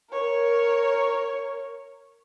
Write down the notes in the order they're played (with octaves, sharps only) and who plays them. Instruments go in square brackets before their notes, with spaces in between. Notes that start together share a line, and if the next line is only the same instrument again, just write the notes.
[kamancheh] A#4 C#5